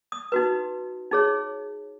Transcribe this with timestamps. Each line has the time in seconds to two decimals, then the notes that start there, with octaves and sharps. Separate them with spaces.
0.12 D#6
0.32 D#4 F#4 B4
1.12 D#4 G#4 C#5